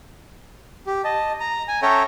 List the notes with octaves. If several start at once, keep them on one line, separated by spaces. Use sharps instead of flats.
G4
D#5 A5
A#5
G#5
C#4 A4 C#5 E5 G5 A#5